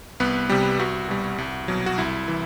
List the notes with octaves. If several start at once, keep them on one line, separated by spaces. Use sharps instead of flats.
C2 B3 B4
C3 G3 G4
C2 F#4
B2 G3
C2
B2 F#3
F#4
C2 E4
E3